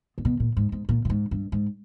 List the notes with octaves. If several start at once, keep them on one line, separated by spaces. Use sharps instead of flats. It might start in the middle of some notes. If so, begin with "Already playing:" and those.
A#2
B2
A#2
G#2
G#2
A#2
A#2
G#2
G2
G#2